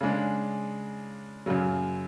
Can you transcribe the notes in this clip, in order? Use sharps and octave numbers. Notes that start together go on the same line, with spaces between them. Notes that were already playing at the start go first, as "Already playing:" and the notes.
C#3 G#3 D4
F#2 C#3 F#3